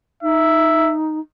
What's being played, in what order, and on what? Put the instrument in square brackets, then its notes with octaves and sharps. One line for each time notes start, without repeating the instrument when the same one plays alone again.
[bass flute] D#4 [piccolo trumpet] E5